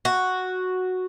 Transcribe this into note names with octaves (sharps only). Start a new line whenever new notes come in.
F#4